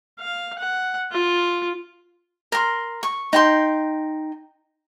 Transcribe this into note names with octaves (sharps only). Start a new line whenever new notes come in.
F5
F#5
F4
A#4 C6
C#6
D#4 G5 C6